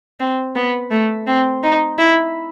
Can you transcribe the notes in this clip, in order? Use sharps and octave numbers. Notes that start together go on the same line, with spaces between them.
C4
B3
A3
C4
D#4
E4